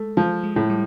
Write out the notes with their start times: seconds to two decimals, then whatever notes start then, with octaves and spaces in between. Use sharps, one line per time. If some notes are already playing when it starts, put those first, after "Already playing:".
Already playing: G#3 A3
0.17 F3 G#3
0.43 G#3
0.56 A2
0.70 G3